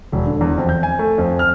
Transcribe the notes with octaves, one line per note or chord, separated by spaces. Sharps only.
E1
D3
E2
F2
G6
G#5
A3
F2
F6